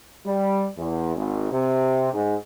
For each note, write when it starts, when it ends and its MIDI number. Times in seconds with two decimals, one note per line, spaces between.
0.24 0.67 55
0.77 1.14 40
1.16 1.47 32
1.50 2.13 48
2.14 2.35 44